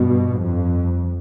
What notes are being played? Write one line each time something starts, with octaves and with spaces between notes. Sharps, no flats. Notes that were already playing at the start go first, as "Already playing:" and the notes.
Already playing: G2 B2
F2